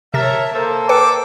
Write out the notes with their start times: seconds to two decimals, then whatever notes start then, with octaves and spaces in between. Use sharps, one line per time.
0.14 C3 A#4 C#5 E5 A5 A6
0.54 A#3 A4 C5
0.89 B4 G5 D6 E6 C#7